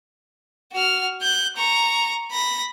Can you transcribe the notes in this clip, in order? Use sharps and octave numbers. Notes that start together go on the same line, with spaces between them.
F#4 F6
F#6 G6
A#5 C#6
B5 A#6